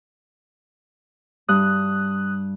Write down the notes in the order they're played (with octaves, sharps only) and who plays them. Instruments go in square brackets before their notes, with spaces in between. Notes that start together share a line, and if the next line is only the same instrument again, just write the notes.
[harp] G2 [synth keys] D#6 F#6